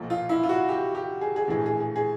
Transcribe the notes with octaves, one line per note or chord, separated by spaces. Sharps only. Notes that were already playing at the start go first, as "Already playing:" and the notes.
Already playing: B1 A#2 F3
F4
E4
F4
F#4
G4
G4
G#4
G#4
A#1 A2 E3 G#4
G#4
G#4
G#4